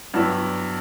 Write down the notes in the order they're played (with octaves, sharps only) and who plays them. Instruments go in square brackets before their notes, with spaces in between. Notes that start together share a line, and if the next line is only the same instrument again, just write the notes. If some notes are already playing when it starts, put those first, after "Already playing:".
[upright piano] G2 F#3 B3 E4